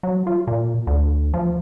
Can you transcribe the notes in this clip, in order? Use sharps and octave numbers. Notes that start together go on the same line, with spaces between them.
F#3
F4
A#2
D2
F3